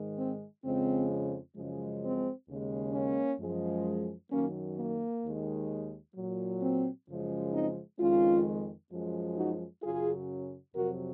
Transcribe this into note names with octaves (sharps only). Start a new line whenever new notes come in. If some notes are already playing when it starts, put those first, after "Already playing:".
Already playing: G#2 D#3 G#3
C4
F2 C#3 F3 G#3 C4
F#2 C#3 F3 G#3
C4
D#2 C#3 G#3
A#3 C#4
F#2 F3 G#3
F#2 D#3 F#3 A#3 C#4
A#3
D#2 D#3 G#3
A#2 F#3
C4
F#2 C#3 F3 G#3
C4 D#4
F2 D#3 G#3 C#4 F4
F#2 F3 G#3
D#4 F#4
F#2 C#3 F#3 F4 G#4
F2 C3 F#3 F#4 A#4